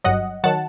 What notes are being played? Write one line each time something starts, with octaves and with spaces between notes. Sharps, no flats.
G1 G2 F#3 D#5 F#5
D#3 F#3 F#5 A5